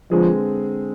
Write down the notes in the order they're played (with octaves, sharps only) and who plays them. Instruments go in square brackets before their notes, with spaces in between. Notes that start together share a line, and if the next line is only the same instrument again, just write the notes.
[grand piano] D3 G#3 C4 G#4 B4 [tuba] F3